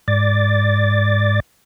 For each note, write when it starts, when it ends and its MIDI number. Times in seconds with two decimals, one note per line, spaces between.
0.08 1.40 44
0.08 1.40 74
0.08 1.40 93